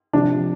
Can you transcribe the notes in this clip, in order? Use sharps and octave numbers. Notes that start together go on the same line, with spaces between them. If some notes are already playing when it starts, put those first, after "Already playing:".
C3 F3 D4